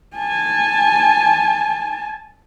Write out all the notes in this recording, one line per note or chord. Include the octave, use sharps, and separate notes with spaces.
G#5 A5